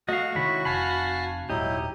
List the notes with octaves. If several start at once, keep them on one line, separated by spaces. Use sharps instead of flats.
A3 F#4 D#5 F5
C3 D#3 G#3 E4 C#5 B5
F1 F5 G#5 A5 B5
D#1 G#2 F#3 D#4 E4 G4 D#5